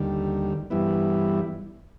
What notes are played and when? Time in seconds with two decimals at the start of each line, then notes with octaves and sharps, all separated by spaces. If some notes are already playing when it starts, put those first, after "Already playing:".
Already playing: D#2 D3 G3
0.70 G2 E3 G3 B3 E4